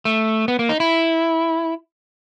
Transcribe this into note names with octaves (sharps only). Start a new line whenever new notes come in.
A3
B3
A#3
D#4
E4